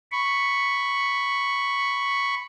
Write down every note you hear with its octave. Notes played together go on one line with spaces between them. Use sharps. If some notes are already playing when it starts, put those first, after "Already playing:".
B5 C#6